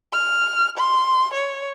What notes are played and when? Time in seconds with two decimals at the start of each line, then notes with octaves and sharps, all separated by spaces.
0.13 F6
0.77 C6
1.34 C#5